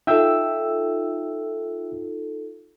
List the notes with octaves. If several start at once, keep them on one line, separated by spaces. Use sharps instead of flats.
D#4 F4 A4 E5 G5 E6